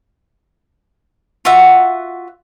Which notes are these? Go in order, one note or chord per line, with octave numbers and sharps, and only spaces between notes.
F4 F#4 E5 F#5